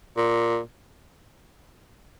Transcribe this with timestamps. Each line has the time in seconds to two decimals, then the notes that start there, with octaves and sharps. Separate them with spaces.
0.17 A#2